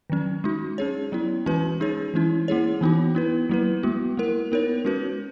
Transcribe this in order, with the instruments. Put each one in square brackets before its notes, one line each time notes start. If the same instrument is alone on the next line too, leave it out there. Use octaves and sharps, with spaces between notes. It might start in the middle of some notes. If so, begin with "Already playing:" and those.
[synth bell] D#3 F#3 C#4
G#3 D#4 F#4
C#4 G#4 C#5
F#3 B3 E4
E3 G#3 C#4 F#4 B4
G#3 D#4 G#4 C#5
E3 G#3 C#4 E4
A#3 E4 G#4 C#5
E3 B3 D#4 F#4
B3 E4 B4
F#3 A#3 E4 B4
G#3 B3 F#4
A#3 E4 A#4
B3 D#4 A#4 C#5
G#3 C#4 F#4 B4